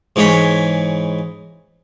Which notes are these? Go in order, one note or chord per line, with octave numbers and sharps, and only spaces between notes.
G#2 E3 G#4 C#5 B5